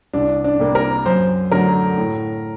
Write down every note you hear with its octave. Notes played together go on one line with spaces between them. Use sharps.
C2 D4
D4
C3 G3 A#3
A#4
F#2 C5
D3 F#3 A3 A#4
A2